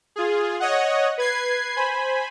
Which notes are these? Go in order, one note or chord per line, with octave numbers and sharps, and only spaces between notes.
F4 G#4
C#5 D#5 F#5
B4 G#6 C7
C5 G#5 B5